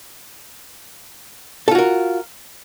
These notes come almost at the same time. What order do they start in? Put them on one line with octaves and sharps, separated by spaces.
A4 F4 F#4 A#4